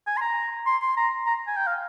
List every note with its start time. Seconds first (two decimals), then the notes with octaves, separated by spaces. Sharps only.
0.07 G#5
0.17 C6
0.21 A#5
0.66 C6
0.82 C6
0.97 A#5
1.26 A#5
1.47 G#5
1.57 G5
1.67 F5